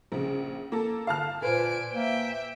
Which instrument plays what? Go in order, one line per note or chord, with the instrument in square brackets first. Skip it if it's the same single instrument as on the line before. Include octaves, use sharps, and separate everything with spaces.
[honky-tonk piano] A#1 C#3
A#3 A4
[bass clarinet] D3 [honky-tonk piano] F5 A5 F6
[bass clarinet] A#2 [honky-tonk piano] B4 C5 [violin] G#5 D7
[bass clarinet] A#3 [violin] E5 G5